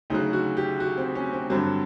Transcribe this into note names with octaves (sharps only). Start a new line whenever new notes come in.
D2 C#3 F#3 D#4
F#4
G4
F#4
C4
C#4
C4
G2 D3 F#3 C4